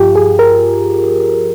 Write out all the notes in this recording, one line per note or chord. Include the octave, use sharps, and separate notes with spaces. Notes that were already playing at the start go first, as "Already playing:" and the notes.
Already playing: G2 F3 F4 G4
G#4
A#4